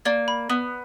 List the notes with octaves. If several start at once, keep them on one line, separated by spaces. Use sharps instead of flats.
A#3 D5
B5
B3 D#6